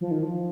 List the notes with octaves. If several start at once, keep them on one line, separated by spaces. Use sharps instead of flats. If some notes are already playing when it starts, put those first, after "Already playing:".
F3
D#3
F3